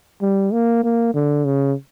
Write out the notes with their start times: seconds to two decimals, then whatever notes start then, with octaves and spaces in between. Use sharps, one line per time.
0.22 G3
0.53 A#3
0.84 A#3
1.15 D3
1.45 C#3